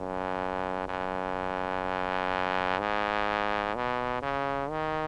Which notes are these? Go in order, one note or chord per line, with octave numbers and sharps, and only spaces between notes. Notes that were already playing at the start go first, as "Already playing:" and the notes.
Already playing: F#2
F#2
G#2
B2
C#3
D#3